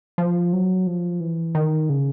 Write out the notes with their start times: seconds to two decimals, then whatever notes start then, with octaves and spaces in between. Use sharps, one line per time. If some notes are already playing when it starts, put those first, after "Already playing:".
0.18 F3
0.53 F#3
0.87 F3
1.20 E3
1.55 D#3
1.89 C#3